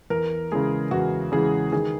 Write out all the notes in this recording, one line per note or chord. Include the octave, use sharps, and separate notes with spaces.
E2 A#4
C#3 E3 G#3 G#4
E2 F#4
C#3 E3 G#3 G#4
D#3 G#4